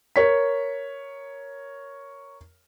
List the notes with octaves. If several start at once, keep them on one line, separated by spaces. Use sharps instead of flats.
A#4 C#5 B6